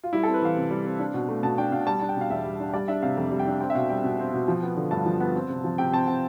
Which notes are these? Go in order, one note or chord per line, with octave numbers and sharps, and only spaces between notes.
F4
G3 E4
C4 A4
B4
E3 F5
C3
G3
C4
D4
B2
A3
B2 A5
D4 G5
B2 F5
G3 A5
D4 A5
G5
B2
F5
E2 E5
G3
D4
G3 D5
D4 E5
C3 F5
F2
G3
G5
D4
C4 G5
E5
B2 F5
G3 G5
B2
C4
B2
F3
B3
D3
G2 A5
F3
B3
C4
C3
F3
C3 G5
C4 A5
C3 G5